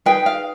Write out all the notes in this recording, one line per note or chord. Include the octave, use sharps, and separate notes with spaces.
D#4 G#4 B4 G5
F5